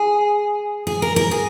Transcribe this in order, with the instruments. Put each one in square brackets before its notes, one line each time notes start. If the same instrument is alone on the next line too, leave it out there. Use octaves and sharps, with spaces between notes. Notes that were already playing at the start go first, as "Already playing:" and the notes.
Already playing: [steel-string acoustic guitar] G#4
G#4
A#4
A#4
G#4